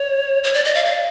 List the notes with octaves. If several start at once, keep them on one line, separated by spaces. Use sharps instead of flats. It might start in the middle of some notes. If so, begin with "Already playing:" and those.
Already playing: C#5
C#5
D5
D#5
F5
F5